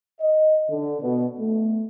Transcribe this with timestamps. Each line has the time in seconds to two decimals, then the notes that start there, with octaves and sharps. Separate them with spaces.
0.20 D#5
0.69 D3
1.01 B2
1.38 A3